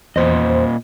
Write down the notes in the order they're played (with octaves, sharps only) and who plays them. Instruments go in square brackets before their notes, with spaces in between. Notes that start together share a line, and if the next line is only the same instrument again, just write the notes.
[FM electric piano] E2 C5 [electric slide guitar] A#2 D#5